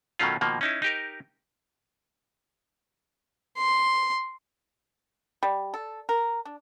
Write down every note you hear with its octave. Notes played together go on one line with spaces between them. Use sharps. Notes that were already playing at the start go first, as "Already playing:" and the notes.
B2 D#3 F#3 A3 C#4 F4
B2 D#3 F3 A#3
C#4 D#4 E4
D#4 G4 A#4
C6
G3
A4
A#4
D4